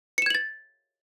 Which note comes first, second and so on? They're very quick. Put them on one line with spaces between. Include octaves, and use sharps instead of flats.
C#7 E7 G#6 F#7 A6